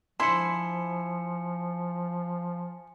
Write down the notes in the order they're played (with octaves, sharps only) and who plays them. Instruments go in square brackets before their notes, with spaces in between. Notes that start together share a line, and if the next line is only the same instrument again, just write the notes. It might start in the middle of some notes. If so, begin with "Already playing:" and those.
[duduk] F3 [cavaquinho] E4 C5 [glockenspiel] G#5 C#7 [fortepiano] C6